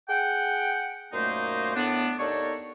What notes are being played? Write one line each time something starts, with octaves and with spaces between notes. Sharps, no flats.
G#4 F#5 G5
F#2 A#2 A3 A#3 D#4 C5
A2 B3 D4
D#2 D4 D#4 A4 C#5